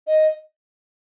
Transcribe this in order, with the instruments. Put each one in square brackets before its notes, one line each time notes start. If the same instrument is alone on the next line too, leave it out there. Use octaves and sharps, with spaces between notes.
[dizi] D#5